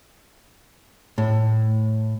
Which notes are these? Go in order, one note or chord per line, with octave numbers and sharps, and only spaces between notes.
A2